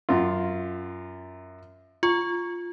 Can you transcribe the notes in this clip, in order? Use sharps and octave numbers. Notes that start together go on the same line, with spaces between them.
F#2 F4
F4 C#6